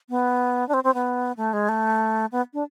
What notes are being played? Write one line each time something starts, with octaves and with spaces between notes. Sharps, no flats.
B3
D4
C4
C4
B3
A3
G#3
A3
B3
D4